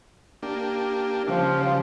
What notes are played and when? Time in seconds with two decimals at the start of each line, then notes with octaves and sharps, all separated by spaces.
0.43 A#3 D4 G4
1.28 C#3 F3 G3